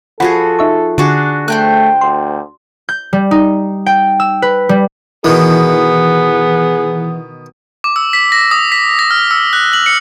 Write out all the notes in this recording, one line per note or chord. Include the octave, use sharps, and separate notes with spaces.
F3 F#4 G#4 A4 F#5 B5
D#4 E5 C#6
D3 D4 F#4 G#4
A3 C5 G5 F#6
D2 C6
G6
G3
D#4
G5
E6
B4
G3
B2 D#3 E3 B3 G#4
D6
E6
B6
A#6
D#6
B6
A#6
F6
E6
F#6
F#7
C#7